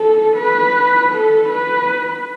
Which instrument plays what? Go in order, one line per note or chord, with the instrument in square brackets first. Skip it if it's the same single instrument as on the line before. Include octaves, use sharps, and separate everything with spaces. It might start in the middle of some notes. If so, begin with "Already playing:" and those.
Already playing: [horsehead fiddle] A4
B4
A4
B4